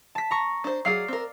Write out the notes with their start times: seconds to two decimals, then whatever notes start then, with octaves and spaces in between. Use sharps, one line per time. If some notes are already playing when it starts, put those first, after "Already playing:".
0.15 A5 B6
0.31 A#5 C#6
0.64 D4 C5
0.85 F#3 G#4 D5 F5 C7
1.08 C4 A#4